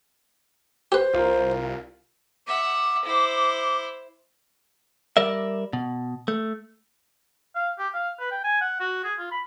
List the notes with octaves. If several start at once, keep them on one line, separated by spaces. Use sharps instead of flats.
G4 B4 C5
C2 F4 A#4
E5 F#5 D6
E4 C5
G3 A#4 D5 E5
B2
A3
F5
G4
F5
B4
G5
G#5
F#5
F#4
G#4
F4
B5